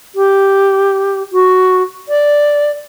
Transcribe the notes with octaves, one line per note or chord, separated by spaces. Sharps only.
G4
F#4
D5